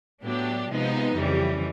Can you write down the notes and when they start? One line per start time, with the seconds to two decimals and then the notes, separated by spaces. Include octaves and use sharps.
0.23 A2 F#3 B3 D4 G4
0.70 C3 F3 G#3 B3 D#4
1.16 F2 C#3 E3 G3